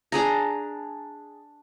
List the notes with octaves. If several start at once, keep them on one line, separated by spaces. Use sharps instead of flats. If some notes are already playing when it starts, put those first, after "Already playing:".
D4 G#4 A#5